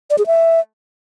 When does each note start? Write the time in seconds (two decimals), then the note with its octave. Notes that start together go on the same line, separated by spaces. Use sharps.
0.10 D5
0.18 G#4
0.27 E5